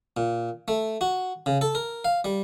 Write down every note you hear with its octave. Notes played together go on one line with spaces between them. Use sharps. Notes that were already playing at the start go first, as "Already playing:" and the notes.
A#2
A3
F#4
C#3
A4
A#4
F5
G3